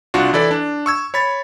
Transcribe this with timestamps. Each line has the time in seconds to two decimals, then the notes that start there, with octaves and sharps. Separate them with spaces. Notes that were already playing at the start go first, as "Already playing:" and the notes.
0.14 C2 D4 F4 F#4
0.33 E3 E4 A4 D5
0.51 D4
0.86 C#6 E6 G#6
1.14 C#5 B5 A6